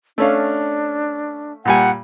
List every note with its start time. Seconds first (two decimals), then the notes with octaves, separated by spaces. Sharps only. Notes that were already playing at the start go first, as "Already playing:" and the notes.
0.18 A3 C#4 D4 F5
1.65 A#2 G3 F#5 G#5